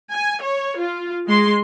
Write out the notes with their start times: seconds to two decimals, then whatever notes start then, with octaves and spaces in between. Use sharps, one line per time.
0.12 G#5
0.43 C#5
0.79 F4
1.27 G#3 C6